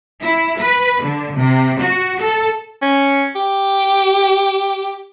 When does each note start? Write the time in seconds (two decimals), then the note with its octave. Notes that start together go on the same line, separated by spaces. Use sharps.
0.23 E4
0.60 B4
1.03 D3
1.36 C3
1.81 F#4
2.21 A4
2.82 C#4
3.36 G4